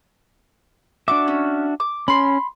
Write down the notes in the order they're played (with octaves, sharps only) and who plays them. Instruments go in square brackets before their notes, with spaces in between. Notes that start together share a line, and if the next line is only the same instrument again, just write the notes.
[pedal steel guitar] D4 F#4 E5 [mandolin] D6
[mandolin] C#4
D6
[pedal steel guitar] C#4 [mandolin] B5 C6